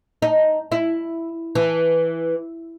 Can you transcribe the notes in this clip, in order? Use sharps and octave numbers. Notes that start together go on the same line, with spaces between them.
D#4
E4
E3